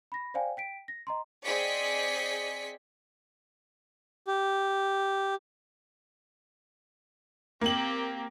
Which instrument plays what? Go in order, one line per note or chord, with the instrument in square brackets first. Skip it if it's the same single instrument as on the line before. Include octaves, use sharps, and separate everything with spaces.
[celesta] B5 A#6
C5 D5 F5 G5 G#5
G5 B6 D7
A#6
D#5 A#5 C6
[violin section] C4 G#4 D5 D#5 B6 C#7
[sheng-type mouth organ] G4
[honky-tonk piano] A#3 F#7 [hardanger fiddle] C4 G4